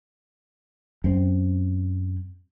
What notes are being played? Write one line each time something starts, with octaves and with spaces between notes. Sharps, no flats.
F#2 C4